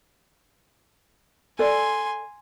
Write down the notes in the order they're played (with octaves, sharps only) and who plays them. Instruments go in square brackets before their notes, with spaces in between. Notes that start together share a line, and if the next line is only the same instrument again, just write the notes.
[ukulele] A4 D5 [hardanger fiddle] G#5 C6